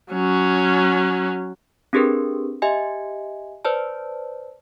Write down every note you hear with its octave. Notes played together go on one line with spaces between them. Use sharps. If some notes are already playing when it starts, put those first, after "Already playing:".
F#3 C#4
C4 D4 G4 G#4 A#4 B4
G4 D#5 E5 G#5
B4 C5 D5 A5